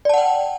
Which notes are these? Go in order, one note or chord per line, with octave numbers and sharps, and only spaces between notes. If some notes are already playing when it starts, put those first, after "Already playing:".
D5 F#5 G5 A5